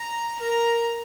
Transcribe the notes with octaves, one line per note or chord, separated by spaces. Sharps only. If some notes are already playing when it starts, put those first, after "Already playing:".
Already playing: A#5
A#4 A#5